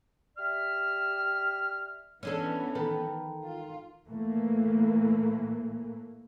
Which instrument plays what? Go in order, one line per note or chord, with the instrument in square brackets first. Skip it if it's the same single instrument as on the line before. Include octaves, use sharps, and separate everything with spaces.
[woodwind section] G4 D5 E5 F6
[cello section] E3 B3 [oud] C#4 D4 A4
[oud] D#3 A4 B4
[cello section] F4
[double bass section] A2 E3 A3 A#3